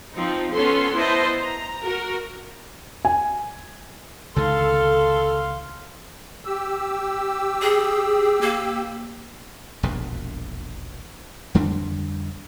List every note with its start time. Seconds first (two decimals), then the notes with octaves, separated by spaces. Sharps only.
0.14 F3 C4 D#4
0.53 B3 C#4 A4 C6
0.96 B3 E4 C5 D#5 E5 A5
1.41 A#5
1.84 F#4 A#4
3.05 G#5
4.36 C#2 D3 D#3 A4 F5 C6
6.45 G4 E6
7.62 G#4
8.41 A#3
9.83 E1 A#1 D#2 B2
11.55 F2 D3 G3 D4